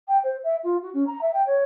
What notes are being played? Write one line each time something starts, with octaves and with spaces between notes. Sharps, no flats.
G5
C5
E5
F4
F#4
C#4
A#5
E5
G5
C#5